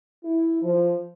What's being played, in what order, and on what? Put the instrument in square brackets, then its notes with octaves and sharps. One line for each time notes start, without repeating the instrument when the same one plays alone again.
[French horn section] E4
F3